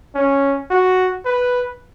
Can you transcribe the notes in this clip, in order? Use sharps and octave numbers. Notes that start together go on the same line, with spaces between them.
C#4
F#4
B4